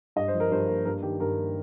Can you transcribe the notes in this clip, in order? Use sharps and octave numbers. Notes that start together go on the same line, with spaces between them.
G2 D#5
C5
F3
A#4
G2 C5
A#3
G2 A#4
D#3 G4
G2 A#4
A#3